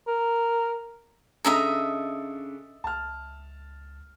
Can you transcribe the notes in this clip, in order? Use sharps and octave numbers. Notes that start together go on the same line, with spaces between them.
A#4
C#3 D4 A4 D#5 E5 A#5
C#2 A5 F6